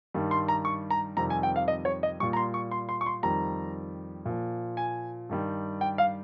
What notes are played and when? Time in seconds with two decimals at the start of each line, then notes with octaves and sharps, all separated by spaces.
0.14 G2 D#3 G3
0.31 C6
0.48 A#5
0.65 C#6
0.90 A#5
1.17 F2 C3 D#3 G3 A#5
1.30 G#5
1.43 G5
1.56 F5
1.68 D#5
1.85 C#5
2.03 D#5
2.20 A#2 G3 C#6
2.33 A#5
2.37 C6
2.54 C#6
2.71 C6
2.89 C6
3.01 C#6
3.06 C6
3.23 F2 D#3 G3 A#5
4.26 A#2 F3
4.77 G#5
5.29 G2 D#3 G3
5.81 G5
5.98 F5